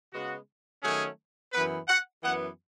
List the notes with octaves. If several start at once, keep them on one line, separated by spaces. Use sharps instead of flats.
C#3 G#3 B3 F#4
D#3 F#3 A3 C#4 G#4
F#2 E3 B3 B4
F#5
F#2 E3 B3 F#5